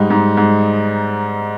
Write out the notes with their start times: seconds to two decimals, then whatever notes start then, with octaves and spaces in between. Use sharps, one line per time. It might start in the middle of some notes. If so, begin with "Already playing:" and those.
Already playing: G#2 G3 D#4
0.10 G#2
0.37 G#2